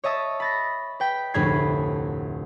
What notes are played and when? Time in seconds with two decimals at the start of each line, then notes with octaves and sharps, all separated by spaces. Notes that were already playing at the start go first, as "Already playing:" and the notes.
0.04 C#5 D#5 E5 A5 D#6
0.40 B5 A6 A#6
1.00 B4 G5 B6
1.34 F1 D2 A2 B5 G#6 C7